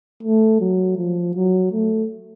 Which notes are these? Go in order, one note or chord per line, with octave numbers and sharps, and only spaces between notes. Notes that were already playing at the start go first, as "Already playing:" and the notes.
A3
F#3
F3
F#3
A3